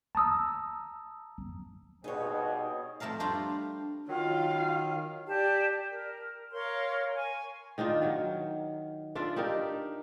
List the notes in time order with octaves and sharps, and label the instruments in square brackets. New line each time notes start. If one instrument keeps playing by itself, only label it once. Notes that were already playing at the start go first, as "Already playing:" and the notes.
[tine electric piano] A5 A#5 D#6 E6
[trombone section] G2 C4 G#4 [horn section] B2 [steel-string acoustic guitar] D#4 C#5
[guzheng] F2 A3 A4 A#4 F5
G3 D4 F4 C5 G5 A#5
[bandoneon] D#3 [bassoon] F#3 [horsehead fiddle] F4 F5
[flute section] G4 D5 A5
A#4
A#4 C#5 F5 C6
G#5 C#6
[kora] D#3 D4 D#4 F4
D#3 F#3
D4 F4 D5 E5
D4 D#4 G4 A#4